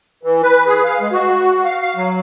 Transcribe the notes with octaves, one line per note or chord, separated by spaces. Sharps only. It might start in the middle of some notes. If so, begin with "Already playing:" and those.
E3
B4
G#4
F5
G#3
F#4
F5
F5
F#3